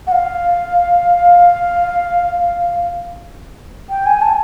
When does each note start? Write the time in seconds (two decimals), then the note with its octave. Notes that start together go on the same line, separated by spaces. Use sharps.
0.07 F#5
0.12 F5
3.90 G5
4.06 G#5
4.22 A5